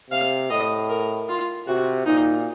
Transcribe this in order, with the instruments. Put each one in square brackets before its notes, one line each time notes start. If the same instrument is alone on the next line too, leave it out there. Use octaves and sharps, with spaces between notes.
[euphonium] C3 [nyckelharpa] F5
[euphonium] A2 [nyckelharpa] D#5
[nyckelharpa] A#4
F4
[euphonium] C3 [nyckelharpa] F#4
[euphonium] A#2 [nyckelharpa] D#4